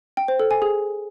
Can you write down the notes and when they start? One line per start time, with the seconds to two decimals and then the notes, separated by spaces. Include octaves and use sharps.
0.17 G5
0.28 C5
0.39 A4
0.51 G#5
0.62 G#4